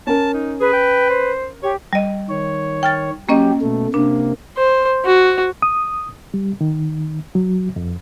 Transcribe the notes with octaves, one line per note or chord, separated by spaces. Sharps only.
C#4 A#4 A5
D#4
G#4 B4
G5
C5
G4 C#5
G3 D#5
D#3 C#5
G5 F6 A6
F#3 A#3 C#4 G4 D#5
B2 A3
C3 A#3 D4
C5
F#4
D#6
G3
D#3
F#3
F2